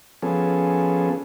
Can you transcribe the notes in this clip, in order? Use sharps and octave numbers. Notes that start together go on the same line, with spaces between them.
F3 B3 C#4 G#4 A4